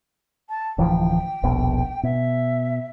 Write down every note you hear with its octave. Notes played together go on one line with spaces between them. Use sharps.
A5
D1 E3 F3 G5
D#1 A#1 B2
B2 E5